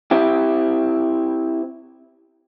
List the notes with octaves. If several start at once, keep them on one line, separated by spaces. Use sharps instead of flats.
C4 E4 G4